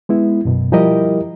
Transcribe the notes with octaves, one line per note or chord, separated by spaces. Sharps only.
G#3 B3 E4
F#2 B2
F3 G3 E4 G4 A#4 D#5